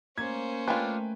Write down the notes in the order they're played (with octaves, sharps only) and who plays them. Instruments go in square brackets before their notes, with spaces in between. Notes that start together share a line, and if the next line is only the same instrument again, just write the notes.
[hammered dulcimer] A#3 [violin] C#4 C5 [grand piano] G#6
[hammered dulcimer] A3 [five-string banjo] D4 F4 [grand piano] B4 G5 G#5